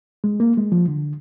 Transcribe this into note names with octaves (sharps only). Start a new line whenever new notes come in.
G#3
A#3
G#3
F3
D3